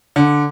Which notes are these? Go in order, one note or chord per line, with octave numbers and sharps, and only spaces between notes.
D3